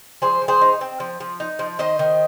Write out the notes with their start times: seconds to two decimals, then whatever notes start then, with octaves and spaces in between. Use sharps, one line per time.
0.22 F3 G#4 C5
0.42 F3
0.48 G#4 C5
0.62 D#4
0.81 C4
1.00 F3
1.20 F3
1.40 D#4
1.59 F3
1.79 D#3 C5 D#5
1.99 D#3